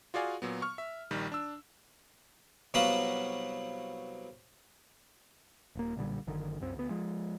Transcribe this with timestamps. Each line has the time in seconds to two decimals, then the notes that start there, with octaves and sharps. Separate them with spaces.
0.14 F4 F#4 G#4 D5 F5 G#5
0.42 A#2 F#3 B3
0.62 C#6 F6
0.78 E5
1.11 A#1 D#3 G3
1.32 D4 E6
2.74 C2 F#3 B3 F#4 F5 B5
5.75 D#1 A#3
5.96 B1 A#2 D3 G3
6.27 F#1 D3 D#3
6.60 C2 F#2 C4
6.76 D2 B3
6.90 F3 G#3